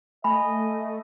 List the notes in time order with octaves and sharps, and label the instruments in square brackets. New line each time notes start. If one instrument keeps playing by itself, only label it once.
[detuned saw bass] A3 [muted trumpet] D#5 [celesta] G#5 [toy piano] B5